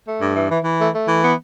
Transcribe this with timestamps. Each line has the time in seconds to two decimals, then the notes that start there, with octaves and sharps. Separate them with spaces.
0.05 A3
0.20 G2
0.35 E3
0.50 E3
0.63 E3
0.79 A3
0.94 A3
1.07 E3
1.23 B3